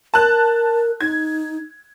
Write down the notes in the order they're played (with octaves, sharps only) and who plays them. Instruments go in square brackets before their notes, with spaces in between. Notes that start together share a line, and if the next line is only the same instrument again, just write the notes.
[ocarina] A#4 [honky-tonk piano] A5 F#6
[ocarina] D#4 [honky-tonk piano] G#6